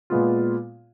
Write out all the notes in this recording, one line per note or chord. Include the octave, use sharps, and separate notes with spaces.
A#2 G#3 B3 F4